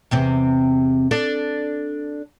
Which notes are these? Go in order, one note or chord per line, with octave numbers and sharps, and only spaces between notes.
E2 C3 C4
D4 A4